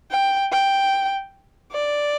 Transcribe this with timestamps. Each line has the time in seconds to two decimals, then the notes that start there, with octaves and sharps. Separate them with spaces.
0.11 G5
0.52 G5
1.72 D5